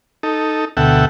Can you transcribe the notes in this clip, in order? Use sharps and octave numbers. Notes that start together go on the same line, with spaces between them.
D#4 A4
D2 B2 A4 E5 F#5 G5